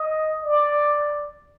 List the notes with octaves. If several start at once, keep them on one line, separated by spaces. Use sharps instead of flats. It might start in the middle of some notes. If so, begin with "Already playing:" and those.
Already playing: D#5
D5